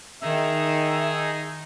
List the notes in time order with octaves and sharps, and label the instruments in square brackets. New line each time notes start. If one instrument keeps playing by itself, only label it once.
[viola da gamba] D#3 [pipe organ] D#4 G#4 [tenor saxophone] E5